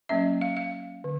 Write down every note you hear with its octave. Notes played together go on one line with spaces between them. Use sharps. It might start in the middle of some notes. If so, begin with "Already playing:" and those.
F#3 A#3 C#4 E5
F5
F5
D3